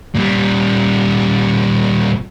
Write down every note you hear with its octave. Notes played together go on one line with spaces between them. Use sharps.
A#2 G3